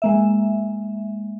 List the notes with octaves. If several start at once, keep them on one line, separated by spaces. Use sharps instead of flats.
G#3 A#3 E5